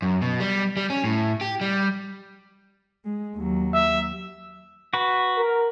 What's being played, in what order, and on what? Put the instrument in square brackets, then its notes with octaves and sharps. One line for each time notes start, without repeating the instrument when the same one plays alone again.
[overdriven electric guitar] F#2
B2
G3
G3
C#4
A2
G4
G3
[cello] G#3
D#2 F#3
[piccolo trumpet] E5
[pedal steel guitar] F#4 B4
[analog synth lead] A#4